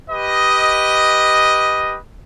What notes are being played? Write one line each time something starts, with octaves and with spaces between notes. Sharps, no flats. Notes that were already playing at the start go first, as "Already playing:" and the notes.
G4 B4 D#5